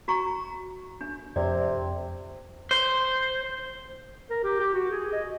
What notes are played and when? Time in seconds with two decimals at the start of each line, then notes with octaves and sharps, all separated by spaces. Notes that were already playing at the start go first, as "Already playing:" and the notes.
0.08 F#4 A#5 C#6
1.01 D4
1.36 F2 C3 D5
2.71 C5
4.30 A#4
4.43 G4
4.60 G4
4.73 F#4
4.90 G#4
5.12 D#5